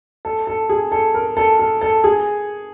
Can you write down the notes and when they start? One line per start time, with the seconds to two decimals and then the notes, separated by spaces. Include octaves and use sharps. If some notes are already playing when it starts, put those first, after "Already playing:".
0.25 A4
0.47 A4
0.69 G#4
0.92 A4
1.14 A#4
1.37 A4
1.59 A4
1.81 A4
2.04 G#4